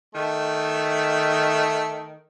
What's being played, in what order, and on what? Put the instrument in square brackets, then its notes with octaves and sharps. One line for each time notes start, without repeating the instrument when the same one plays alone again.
[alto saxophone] D#3 [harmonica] A3